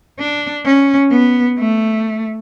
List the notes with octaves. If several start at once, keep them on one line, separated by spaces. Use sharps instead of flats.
D4
C#4
B3
A3